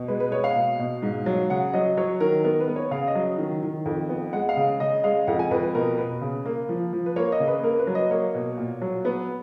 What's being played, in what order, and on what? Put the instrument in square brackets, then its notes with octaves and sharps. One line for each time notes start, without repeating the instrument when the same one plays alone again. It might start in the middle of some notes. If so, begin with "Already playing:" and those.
Already playing: [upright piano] B2
G#3 B4
B4
B3 C#5
F5
B2
B2
G#2
F#3
C#3 F#5
F#3 D#5
F#3 C#5
D#3 A#4
B3 A#4
B4
B3
C#5
C#3 F5
D#5
F#3
D#3
D#3
F2
B3
G#3 F#5
F5
C#3
C#3 D#5
G#3 F5
F2 F#5
G#5
F2 B4
B4
B2 A#4
B2 B4
C#3
A#3
F3
F3
B4
A#3 C#5
D#5
C#3
B4
A#3 A#4
B4
F#3
D#5
A#3 C#5
B2
A#2
F#3
B3 B4